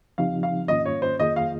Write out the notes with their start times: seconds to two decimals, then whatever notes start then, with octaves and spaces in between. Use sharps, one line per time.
0.18 C#3 F3 C4 D#4 G4 F5
0.43 F5
0.68 G#2 D#3 A#3 C#4 F4 D#5
0.86 C#5
1.02 C5
1.20 F2 D#3 A#3 F4 G#4 D#5
1.36 F5